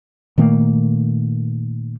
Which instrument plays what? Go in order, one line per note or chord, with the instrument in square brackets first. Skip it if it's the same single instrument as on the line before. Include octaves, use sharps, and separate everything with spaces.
[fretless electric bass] A#2 D#3 A3 A#3